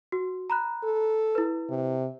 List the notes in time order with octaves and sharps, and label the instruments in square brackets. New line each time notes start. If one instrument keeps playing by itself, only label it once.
[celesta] F#4
A#5 B5 F#6
[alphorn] A4
[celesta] E4 B4
[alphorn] C3